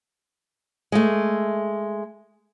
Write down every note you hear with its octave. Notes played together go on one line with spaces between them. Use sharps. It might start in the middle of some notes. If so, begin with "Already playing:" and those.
G#3 A3